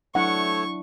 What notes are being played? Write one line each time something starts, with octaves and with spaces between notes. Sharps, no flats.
F#3 A3 D4 E4 C#5 F#5 C#6